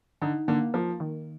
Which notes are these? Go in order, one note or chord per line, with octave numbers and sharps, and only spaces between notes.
D3 D#4
D3 A#3
F3 A#3
D#3